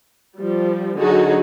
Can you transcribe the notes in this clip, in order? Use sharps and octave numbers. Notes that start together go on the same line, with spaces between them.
F3 G3
D3 F#3 D#4 F#4 G#4